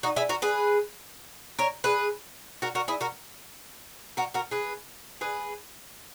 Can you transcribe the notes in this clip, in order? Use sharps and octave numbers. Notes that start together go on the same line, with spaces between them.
D#4 F#4
E4 G#4
F#4 A#4
G#4 B4
A#4 C#5
G#4 B4
F#4 A#4
F#4 A#4
E4 G#4
F#4 A#4
F#4 A#4
F#4 A#4
G#4 B4
G#4 B4